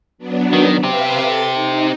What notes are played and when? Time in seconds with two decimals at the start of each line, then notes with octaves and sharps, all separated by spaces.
0.18 F#3 B3 D4
0.53 D#3
0.83 C4 G4 B4 E5 F5
1.22 A4 C6 A6
1.52 D#4